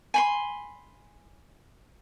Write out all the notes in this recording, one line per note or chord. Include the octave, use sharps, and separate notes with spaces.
G#5 B5 C6